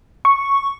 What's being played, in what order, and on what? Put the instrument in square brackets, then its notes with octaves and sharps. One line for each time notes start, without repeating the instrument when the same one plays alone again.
[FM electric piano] C#6